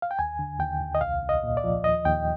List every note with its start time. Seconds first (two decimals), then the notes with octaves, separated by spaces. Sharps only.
0.02 F5
0.11 G5
0.19 D#2 G#5
0.39 D3
0.60 D#2 G5
0.81 D#2
0.95 D#5
1.01 C2 F5
1.22 C2
1.29 D#5
1.44 A#2
1.57 D5
1.64 F3
1.84 D#2 D#5
2.05 D#2 G5